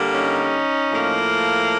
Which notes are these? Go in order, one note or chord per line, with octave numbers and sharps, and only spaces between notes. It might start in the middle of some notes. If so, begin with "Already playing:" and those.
Already playing: D3 G3 A#3
C#4 D#4
A2 F3 A#3